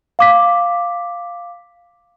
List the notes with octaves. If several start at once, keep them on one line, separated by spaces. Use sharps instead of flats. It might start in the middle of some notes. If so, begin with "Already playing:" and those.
F5 D6 B6